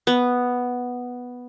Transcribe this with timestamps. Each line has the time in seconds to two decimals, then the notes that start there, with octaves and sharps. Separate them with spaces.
0.07 B3